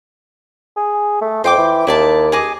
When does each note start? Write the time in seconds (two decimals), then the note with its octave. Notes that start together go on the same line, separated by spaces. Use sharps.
0.77 G#4
1.21 A3
1.44 F2 C5 G5 D6
1.58 E3
1.87 D#2 E4 D5 A5
2.32 G#4 D#5 D6